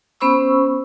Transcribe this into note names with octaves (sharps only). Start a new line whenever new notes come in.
B3 C#4 C5 B5 C#6 E6